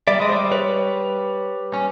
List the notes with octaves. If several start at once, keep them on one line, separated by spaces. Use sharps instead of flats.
G3 D5 E5
G#3 D#5
G3 C5 D5
B4 C#5
C#4